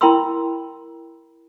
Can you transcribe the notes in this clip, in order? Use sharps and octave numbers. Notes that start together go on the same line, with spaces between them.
E4 A#4 G5 B5 C6 E6